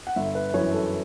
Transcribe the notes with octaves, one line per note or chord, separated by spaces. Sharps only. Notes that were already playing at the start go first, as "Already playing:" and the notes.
F#5
G1 E5
B4
F#2 E3 C#5
A4